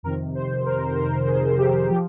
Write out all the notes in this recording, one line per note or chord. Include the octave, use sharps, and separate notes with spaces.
F2 C3 D#3 A#4
C5
A#4
A#4
G#4
G4
F3 G4